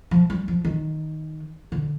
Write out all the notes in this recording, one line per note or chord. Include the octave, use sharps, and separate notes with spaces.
F3
G3
F3
D#3
D3